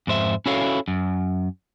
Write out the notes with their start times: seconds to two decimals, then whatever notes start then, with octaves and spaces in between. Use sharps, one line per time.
0.07 F2 G#2 C5 E5
0.46 C#4 E4 F#4 A4 C#5 F5
0.88 F#2